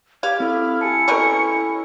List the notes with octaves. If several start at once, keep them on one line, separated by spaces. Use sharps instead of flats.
G4 F5 G#6
C4 E4 A4 F6
G4 G#5 A5 C#7
B2 C#4 A4 A#4 G#5